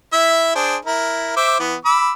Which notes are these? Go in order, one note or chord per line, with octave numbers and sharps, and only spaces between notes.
E4 E5
D4 G#4 C5
E4 A#4
C5 E5 D6
E3 B3
B5 D6 E6